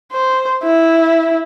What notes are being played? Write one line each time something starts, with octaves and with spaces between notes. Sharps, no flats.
C5
E4